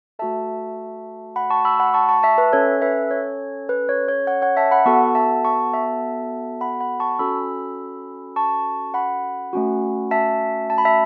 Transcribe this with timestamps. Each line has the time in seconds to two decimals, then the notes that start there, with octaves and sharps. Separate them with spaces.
0.19 A3 F#4 A4 E5 A5
1.36 F#5 B5
1.50 A5 C#6
1.65 B5 E6
1.80 F#5 B5
1.94 A5 C#6
2.09 A5 C#6
2.23 E5 A5
2.38 B4 E5
2.53 C#4 A4 C#5
2.82 B4 E5
3.11 C#5
3.69 B4
3.89 C#5
4.08 C#5
4.27 C#5 F#5
4.42 C#5 F#5
4.57 E5 A5
4.71 F#5 B5
4.86 B3 F#4 A4 A5 C#6
5.15 E5 A5
5.44 A5 C#6
5.74 E5 A5
6.61 F#5 B5
6.80 F#5 B5
7.00 A5 C#6
7.19 C#4 F#4 A4 B5 E6
8.36 A5 C#6
8.94 F#5 B5
9.53 A3 C#4 F#4
10.11 E5 A5
10.70 A5
10.78 B5
10.85 E5 A5